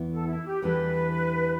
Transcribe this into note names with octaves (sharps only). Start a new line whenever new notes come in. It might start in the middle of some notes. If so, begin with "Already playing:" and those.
Already playing: E2 E3 B3
A4
E4
G4
E2 E3 G3 D4 A4 B4